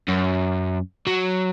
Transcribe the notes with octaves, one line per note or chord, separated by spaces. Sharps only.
F#2
F#3